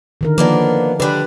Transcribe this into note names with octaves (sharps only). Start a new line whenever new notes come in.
D3 D#3 A#4
F3 A#3 B3 D4
D3 G3 B4